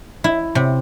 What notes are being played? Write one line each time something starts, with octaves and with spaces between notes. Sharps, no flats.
E4
C3